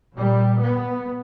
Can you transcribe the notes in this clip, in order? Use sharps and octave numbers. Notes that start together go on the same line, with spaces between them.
A#2 G3
B3